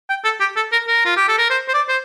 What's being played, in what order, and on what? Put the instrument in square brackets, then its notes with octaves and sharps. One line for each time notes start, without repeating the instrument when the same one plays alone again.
[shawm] G5
A4
G4
A4
A#4
A#4
F4
G4
A4
A#4
C5
C5
D5
C5